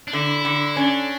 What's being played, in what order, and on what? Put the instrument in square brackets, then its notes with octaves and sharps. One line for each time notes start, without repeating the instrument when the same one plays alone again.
[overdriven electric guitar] D4
[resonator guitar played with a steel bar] D3 [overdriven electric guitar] E4
[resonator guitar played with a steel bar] D3
[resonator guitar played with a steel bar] C#4 [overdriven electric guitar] D4